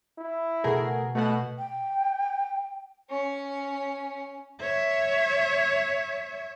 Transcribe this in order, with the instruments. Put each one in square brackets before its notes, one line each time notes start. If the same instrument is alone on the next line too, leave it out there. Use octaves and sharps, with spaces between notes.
[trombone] E4
[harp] B2 [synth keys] A3 G#4 A#4
[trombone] B2 [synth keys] A3 F#4 F#5
[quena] G5
[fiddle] C#4 C#5
[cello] C#5 E5